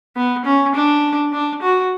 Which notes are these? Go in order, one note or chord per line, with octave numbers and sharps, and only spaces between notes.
B3
C#4
D4
D4
F#4